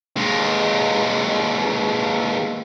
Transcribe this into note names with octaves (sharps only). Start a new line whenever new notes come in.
D#2 G#3